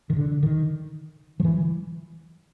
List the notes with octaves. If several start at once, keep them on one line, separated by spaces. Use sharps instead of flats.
D#3
D3
D#3
F3
E3